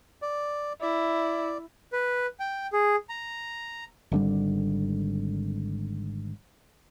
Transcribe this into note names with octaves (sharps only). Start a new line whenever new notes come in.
D5
E4 D5
B4
G5
G#4
A#5
G#1 D3 G3